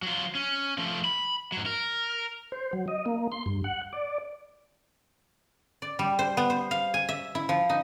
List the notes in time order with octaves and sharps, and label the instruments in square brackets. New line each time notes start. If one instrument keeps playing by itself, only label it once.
[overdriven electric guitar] F#3 F4
C#4
F3 A3
B5
G#2 F#3
A#4
[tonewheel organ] C5
F#3
D#5
A#3
C6
G2
F#5
D5
[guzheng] D5
G3
C5
B3
C5
F5
G#5
E5
E4
F3
D#4